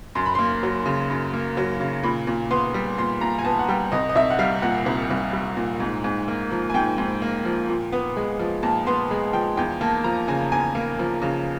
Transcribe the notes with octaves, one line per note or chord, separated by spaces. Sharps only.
F#2 C6
B5
A#3 C6
F#3
C#3
F#2
A#3
F#3
C#3
A#2 B5
A#2
B3 C6
G3
A#2 C6
A#2 A#5
G#5
B3 A5
F#5
G3 G5
C2 D#5
D#5
C2 E5
F#5
G3 F5
A#2 F#5
C2
C2
G3
A#2
G#2
G#2
A#3
F3
G#5
G#2 G5
G#2
A#3
F3
A#2
B3
G#3
F3
A#2 A5
B3 C6
G#3
F3 G5
E2 G5
A#3 A5
F3 A#5
C#3 G#5
E2 G#5
A#3
F3
C#3